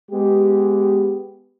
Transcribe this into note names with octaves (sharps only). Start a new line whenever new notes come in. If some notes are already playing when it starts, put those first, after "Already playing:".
G#3 B3 G4